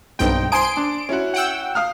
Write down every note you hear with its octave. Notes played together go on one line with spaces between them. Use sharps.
B1 G2 C4 D#4 G5
C5 G#5 C6 D#6 D7
D4
C#4 E4 F#4
F#5 G5 E6
F5 D#6 F6